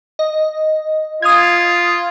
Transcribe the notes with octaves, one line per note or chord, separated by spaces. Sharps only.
D#5
F4 D#6 F6 G#6